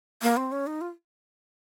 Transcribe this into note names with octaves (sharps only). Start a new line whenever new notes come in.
A#3
C4
C#4
D#4
F4